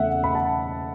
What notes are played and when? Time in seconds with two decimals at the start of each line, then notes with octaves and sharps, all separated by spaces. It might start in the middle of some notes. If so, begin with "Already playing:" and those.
Already playing: E2 C#3 A3 E5 F#5
0.24 B5
0.35 A5